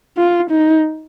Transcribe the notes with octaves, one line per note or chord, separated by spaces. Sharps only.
F4
D#4